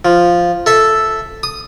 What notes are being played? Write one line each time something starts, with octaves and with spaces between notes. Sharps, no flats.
F3
A4 E5
D#6